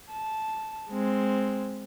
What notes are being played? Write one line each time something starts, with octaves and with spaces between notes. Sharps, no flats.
A5
G#3 C4